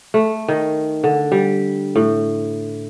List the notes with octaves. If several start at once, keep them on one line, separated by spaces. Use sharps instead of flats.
A3
D#3
D3
G3
A2